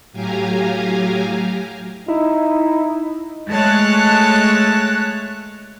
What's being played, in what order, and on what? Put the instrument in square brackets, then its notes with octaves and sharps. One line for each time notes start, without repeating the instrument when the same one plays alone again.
[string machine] A2 F#3 G4 F5 G#5 A#5
[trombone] D#4 [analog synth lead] E4
[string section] G#3 A3 C#5 A5 F#6